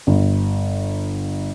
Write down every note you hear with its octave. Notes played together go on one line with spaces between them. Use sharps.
G1